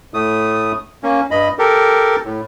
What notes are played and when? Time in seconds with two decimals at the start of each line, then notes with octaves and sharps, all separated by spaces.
0.14 A2 A3 D#6
1.03 A#3 C#4
1.31 G2 D#5 B5
1.59 G4 A4 A#4
2.25 A2